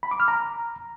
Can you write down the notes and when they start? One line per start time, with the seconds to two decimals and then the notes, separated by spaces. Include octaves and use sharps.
0.03 B5
0.11 D6
0.20 F6
0.28 A#5